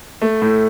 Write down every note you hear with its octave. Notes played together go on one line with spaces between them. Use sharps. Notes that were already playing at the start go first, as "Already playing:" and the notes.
A3
A2